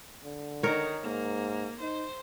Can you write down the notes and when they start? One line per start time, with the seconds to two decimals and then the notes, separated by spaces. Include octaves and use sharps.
0.23 D3
0.63 D#3 D#4 A#4 C#5
1.03 G#2 A#3
1.81 D#4 C5